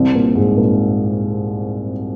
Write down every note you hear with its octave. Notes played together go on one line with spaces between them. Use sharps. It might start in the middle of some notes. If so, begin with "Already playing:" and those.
Already playing: C2 C3
A#2 A#3
G#2 G#3
A#2 A#3